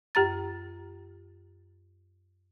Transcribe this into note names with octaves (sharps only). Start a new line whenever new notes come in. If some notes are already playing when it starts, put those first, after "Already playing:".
F#2 G4 A#5 A6